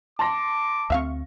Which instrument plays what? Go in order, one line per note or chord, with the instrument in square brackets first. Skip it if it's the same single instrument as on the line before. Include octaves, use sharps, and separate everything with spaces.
[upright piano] A5 C6 A#6 [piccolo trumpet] D6
[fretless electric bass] D2 C4 [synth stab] E5 F5 C#6